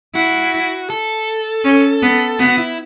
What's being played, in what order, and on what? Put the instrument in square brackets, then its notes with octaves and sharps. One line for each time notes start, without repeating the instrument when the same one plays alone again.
[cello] E4 [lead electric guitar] F#4
[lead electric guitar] A4
[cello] C#4
B3
[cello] B3 [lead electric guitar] F#4
[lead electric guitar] E4